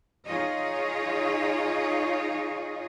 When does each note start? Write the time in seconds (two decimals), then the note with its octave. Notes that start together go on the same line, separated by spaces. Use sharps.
0.25 D#4 F4 G#4 C#5 D#5